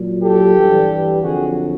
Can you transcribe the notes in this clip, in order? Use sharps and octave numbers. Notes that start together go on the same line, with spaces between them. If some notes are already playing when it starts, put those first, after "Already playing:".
Already playing: A#2 F#3
G4 A4
G2 E3 G3
F2 D3 F#3 F#4 G#4